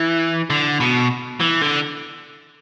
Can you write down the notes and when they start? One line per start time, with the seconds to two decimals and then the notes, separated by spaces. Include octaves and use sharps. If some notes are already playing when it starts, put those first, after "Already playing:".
Already playing: E3
0.50 D3
0.80 B2
1.41 E3
1.62 D3